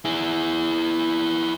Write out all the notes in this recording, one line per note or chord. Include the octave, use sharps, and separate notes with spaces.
E4 G#4